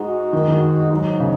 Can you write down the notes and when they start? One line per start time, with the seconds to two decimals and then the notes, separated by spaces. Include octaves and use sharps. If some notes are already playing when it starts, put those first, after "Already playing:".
Already playing: G#2 G#3 D#4 F#4
0.33 D#3
0.48 D#3
0.91 G#2 F#3 D#4
1.20 C#3